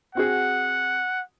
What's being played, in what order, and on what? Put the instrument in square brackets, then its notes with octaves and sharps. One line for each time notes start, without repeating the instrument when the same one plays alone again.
[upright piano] C4 F#4 G#4 [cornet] F#5